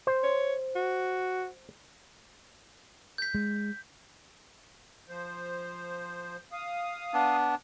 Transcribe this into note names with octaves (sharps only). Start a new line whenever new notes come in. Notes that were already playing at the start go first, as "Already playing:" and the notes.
C5
C#5
F#4
G6 B6
G#3
F3 C5
F5 D#6
B3 D4